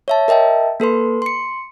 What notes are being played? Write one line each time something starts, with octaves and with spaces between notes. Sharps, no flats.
C#5 E5 A5
A#4 D#5 E5 G5 A5
A#3 A4 B4 C6
C6 C#7